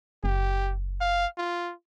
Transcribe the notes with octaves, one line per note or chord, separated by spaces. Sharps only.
F#1 G4
F5
F4